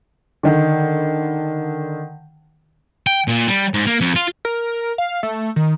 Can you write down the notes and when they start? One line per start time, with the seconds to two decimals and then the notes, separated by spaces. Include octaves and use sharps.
0.43 D3 D#3
3.07 G5
3.28 A#2
3.48 G3
3.74 G#2
3.87 A#3
4.01 F2
4.16 F4
4.45 A#4
4.98 F5
5.23 A3
5.56 D#3